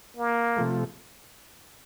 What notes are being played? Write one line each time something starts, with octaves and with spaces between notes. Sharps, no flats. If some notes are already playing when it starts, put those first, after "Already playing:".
A#3
C3 F3 A3